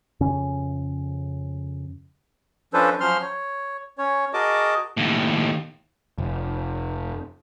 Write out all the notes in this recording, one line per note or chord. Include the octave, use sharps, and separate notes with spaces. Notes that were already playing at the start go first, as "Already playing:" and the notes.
F2 C#3 C#4
F3 C#4 D4 A4 B4 C5
F3 F#3 C#4 C5 C6 F6
C#5
C#4 C#5
F#4 G#4 A#4 D#5 A5 D6
D#2 A2
F1